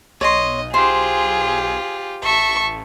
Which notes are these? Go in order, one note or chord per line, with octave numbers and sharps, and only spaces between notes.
B1 C#5 D#5 C6
F4 G4 G#4 C5
A1 E5 A5 C#6